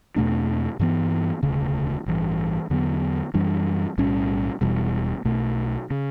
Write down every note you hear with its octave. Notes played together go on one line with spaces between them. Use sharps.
E2 B2 A3 D4
G2 E3 B3
E1 D2 C#3
A1 G2 E3
E2 D3 F#3 B3
F#2 E3 G3 D4
B1 A2 G3 C#4
E1 E2 B2 G3
B1 B2 A3
C#3